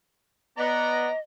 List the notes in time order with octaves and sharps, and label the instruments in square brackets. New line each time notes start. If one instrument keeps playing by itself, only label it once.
[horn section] B3 [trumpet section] D5 A#5 [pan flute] D#5